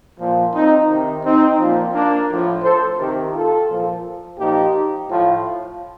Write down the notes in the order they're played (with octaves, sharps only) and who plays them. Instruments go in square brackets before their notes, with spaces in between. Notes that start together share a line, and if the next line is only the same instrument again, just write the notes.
[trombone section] A#2 F3
C4 D#4
C3 D#3
C4 D#4
A#2 F3
A#3 D4
A2 F3
A4 C5
C3 D#3 G4 A#4
F4 A4
A#2 F3
A#2 F3 D#4 G4
A2 F3